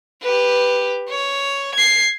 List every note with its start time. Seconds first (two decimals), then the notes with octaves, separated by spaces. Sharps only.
0.22 G4 B4
1.10 C#5
1.76 G#6 C7